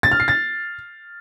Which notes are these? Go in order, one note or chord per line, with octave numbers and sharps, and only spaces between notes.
A6
F6
C7
A6